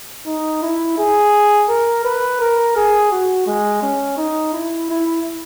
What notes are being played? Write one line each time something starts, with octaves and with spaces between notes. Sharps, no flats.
D#4
E4
G#4
A#4
B4
A#4
G#4
F#4
G#3
C#4
D#4
E4
E4